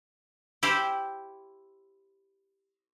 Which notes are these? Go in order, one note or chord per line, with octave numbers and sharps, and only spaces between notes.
E4 G4 C5